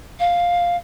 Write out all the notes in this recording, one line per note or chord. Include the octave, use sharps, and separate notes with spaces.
F5